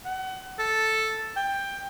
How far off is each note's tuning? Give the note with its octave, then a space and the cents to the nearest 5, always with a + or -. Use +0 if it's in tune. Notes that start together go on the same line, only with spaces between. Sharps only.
F#5 +30
A4 +0
G5 +15